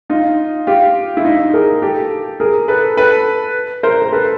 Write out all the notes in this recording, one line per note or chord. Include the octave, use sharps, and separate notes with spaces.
D#4 F4
F4 G4
E4
D#4 F4
G#4 A#4
G4 A4
G#4 A#4
A4 B4
A4 B4
A#4 C5
A#4
A4 B4